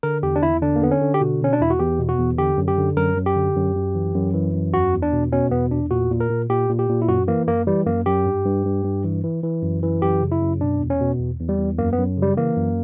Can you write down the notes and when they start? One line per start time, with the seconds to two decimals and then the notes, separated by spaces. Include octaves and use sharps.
0.03 D3 A#4
0.23 E2 G4
0.36 D4
0.42 E2 E4
0.62 D3 D4
0.76 A#3
0.82 D3 B3
0.91 C#4
1.01 D3
1.14 G4
1.21 B2 F#4
1.40 B2 C#4
1.53 D4
1.60 E2 E4
1.70 F#4
1.80 E2 G4
1.99 B2
2.09 F#4
2.19 E2
2.38 D3 G4
2.58 F#2
2.68 G4
2.78 D3
2.97 F#2 A#4
3.17 F#2
3.26 G4
3.36 D3
3.56 F#2
3.75 F#2
3.95 E3
4.15 F#2
4.34 E3
4.54 F#2
4.73 E2 F#4
4.93 E2
5.02 D4
5.13 B2
5.32 B2 C#4
5.51 E2 B3
5.71 E2 D4
5.90 A#2 F#4
6.10 A#2
6.20 A#4
6.30 A#2
6.49 A#2 G4
6.69 A#2
6.79 G4
6.89 A#2
7.02 E4
7.08 F#2 F#4
7.28 E3 A#3
7.47 F#2 A#3
7.67 E3 G3
7.86 F#2 A#3
8.06 F#2 G4
8.26 G2
8.46 G2
8.65 G2
8.84 G2
9.04 E3
9.24 E3
9.43 E3
9.63 F#2
9.83 E3
10.02 F#2 G4
10.22 C#3
10.32 E4
10.41 F#2
10.61 B2 D4
10.80 E2
10.90 C#4
11.00 B2
11.20 E2
11.39 E2
11.49 G3
11.59 E2
11.78 F#2 A#3
11.93 B3
11.98 F#2
12.18 C#3 G3
12.37 E3 A#3
12.57 F#2